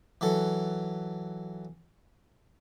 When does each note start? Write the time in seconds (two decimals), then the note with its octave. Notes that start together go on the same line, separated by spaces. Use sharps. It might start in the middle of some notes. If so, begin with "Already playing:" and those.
0.21 E3 F#3 A4